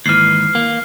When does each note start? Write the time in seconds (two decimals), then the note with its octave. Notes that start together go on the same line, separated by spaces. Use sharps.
0.06 D#2 G#2 E3 F6 C7
0.55 A#3